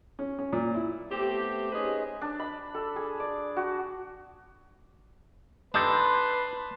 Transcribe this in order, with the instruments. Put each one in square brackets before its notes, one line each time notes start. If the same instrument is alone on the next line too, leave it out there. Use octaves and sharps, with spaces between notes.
[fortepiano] C#4
C#4
A#2
E4
[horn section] A3 B3 C4 G4
C#4 D#4 G#4 B4 C5 D#5
[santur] D4
B5
A4
G#4
D5
F#4
[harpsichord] D4 [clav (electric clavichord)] D#4 G4 A4 [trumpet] B4 [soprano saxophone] C6